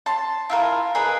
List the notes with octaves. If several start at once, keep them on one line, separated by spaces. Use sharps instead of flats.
A5 C6
E4 F4 A#4
G#4 A#4 B4 D#5